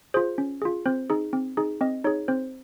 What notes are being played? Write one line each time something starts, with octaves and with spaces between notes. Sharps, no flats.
F4 G#4 C5
C#4
F4 G#4
C4 C5
D#4 G#4
C4
D#4 G#4
C4 D#5
D#4 G#4 C#5
C4 C5